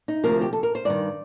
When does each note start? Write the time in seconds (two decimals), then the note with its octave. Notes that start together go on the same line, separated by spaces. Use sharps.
0.08 D#4
0.23 D2 C3 F3 A#4
0.41 G4
0.53 A4
0.63 A#4
0.75 C5
0.85 G2 D#3 D5